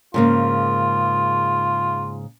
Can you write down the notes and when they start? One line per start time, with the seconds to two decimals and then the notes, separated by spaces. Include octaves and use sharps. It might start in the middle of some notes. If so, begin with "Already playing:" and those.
0.14 G#2 C#3 A#3 F4